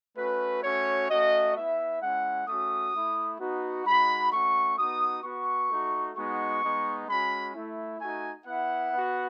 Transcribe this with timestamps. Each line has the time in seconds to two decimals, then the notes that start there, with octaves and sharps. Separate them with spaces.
0.17 A3 C#4 F#4 B4
0.63 A3 C#4 F#4 C#5
1.09 A3 C#4 F#4 D#5
1.56 B3 E4 E5
2.01 G#3 C#4 E4 F#5
2.48 A3 C#4 F#4 D#6
2.94 A3 E4
3.39 B3 D#4 F#4
3.86 G#3 D#4 F#4 B5
4.31 A3 C#4 F#4 C#6
4.78 B3 D#4 F#4 D#6
5.24 B3 F#4 C#6
5.70 A3 D#4 F#4
6.16 G#3 B3 D#4 F#4 C#6
6.62 G#3 B3 D#4
7.08 G#3 C#4 F#4 B5
7.55 A3 E4
8.00 A3 D#4 F#4 G#5
8.46 B3 E4 F#5
8.92 B3 F#4